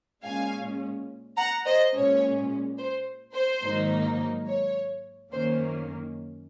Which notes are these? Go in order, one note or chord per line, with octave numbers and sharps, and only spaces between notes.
A#2 G#3 C#4 F5 G#5
F#5 A#5
C5 D#5
A#2 G#3 C#4 C#5
C5
C5
G#2 D#3 F#3 A#3 D#4
C#5
F#2 D#3 A#3 C#4 C5